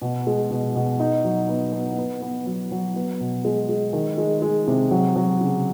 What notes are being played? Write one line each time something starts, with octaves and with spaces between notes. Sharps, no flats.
B2
G#3
B2
B2
D#4
F#3
B3
B3
B3
B3
F#3
F#3
B3
B2
G#3
G#3
D#3
G#3
G#3
C3
F#3
F#3
C#3